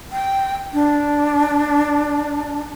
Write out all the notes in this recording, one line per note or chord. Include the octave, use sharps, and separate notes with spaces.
G5
D4